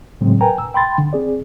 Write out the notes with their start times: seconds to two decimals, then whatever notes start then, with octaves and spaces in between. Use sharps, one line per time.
0.21 A2 C#3 F#3 G#3 C4
0.41 A#4 B4 G5 G#5 A#5
0.58 E6
0.74 G5 B5 C6 A6
0.98 D3
1.13 C4 G#4 D5